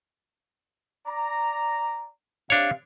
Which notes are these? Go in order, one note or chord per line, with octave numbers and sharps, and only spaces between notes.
D5 A#5
C3 D4 C#5 F5